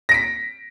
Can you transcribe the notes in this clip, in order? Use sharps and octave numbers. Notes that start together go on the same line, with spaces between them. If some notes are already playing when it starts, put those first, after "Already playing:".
A#6 B6 D7